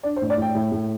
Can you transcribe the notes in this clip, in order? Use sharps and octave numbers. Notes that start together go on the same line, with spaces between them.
D4 D5
C5
A2
D5
A2 G5
A2
A2